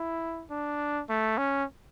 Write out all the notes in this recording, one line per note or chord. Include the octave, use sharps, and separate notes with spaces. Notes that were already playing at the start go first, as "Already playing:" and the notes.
Already playing: E4
D4
A3
C#4